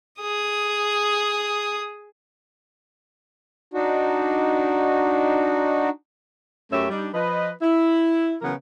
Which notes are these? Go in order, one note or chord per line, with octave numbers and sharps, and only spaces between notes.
G#4 D#6
D4 D#4 F#4
F#2 A3 C#4 G4 C#5 E5
G3 D4 D#4
F3 B4 D#5
E4
C#3 E3 F#3 B3 A#4 B4